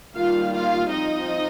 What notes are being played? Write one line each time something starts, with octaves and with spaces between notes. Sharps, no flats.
D#3 G3 A#3 F4 F5
F4 F5
F3 C4 D#4 D#5